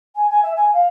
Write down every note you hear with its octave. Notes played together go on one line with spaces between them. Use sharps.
G#5
G#5
E5
G#5
F5